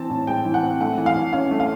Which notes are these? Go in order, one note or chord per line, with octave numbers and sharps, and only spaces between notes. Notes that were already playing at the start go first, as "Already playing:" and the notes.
Already playing: E3 C4 A5
A2
G#3 G5
E3
F#5
C4
A3 F#5
E3
F5
E3
C#4 F5
A3
F5